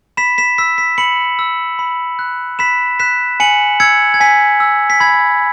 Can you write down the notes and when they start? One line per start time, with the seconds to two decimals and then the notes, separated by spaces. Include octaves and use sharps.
0.17 B5 B6 E7
0.38 B6 E7
0.58 E6 B6
0.78 B6
0.98 B5 C#7 F#7
1.39 E6
1.79 B5
2.19 F#6
2.59 B5 B6 E7
3.00 F#6 B6 E7
3.40 G#5 C#7 F#7
3.80 E6 G#6 C#7
4.14 G#6
4.20 G#5 B6
4.60 E6
4.90 B6
5.00 B5 G#6